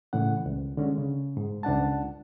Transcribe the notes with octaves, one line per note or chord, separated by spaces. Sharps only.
A2 C#3 E3 F#5
C#2
D3 G#3 C#4
C#3
G#2
C#2 D4 F#5 A5